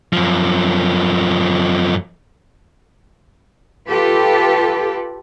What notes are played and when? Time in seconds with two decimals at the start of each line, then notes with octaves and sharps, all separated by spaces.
0.13 F#2 F3
3.89 F4 G4 A4 B4